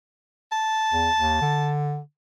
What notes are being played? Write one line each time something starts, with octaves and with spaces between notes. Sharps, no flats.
A5
E2
D#2
D3